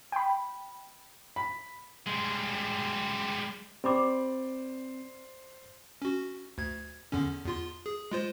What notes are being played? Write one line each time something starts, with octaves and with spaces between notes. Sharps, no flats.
G5 B5
B5
G3 G#3
C4 G4 C5 D5 B5 D6
C#4 F#4
D2 G#6
E2 D3 C#4
E2 F4 C6
G#4
G#3 F4 C5